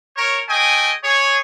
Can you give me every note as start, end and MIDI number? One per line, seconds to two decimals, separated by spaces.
0.17 0.40 70
0.17 0.40 73
0.49 0.92 57
0.49 0.92 68
0.49 0.92 75
0.49 0.92 79
0.49 0.92 80
1.03 1.37 68
1.03 1.37 73